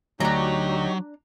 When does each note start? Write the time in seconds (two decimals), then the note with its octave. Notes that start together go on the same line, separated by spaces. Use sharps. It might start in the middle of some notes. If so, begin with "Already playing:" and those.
0.20 D2 F#3 D4 D#4 G4 C#5 A#5